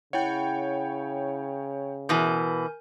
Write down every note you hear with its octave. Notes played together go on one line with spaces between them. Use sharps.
C#3 E4 C#5 F#5 G5
B2 E3 A#4 G#5 G6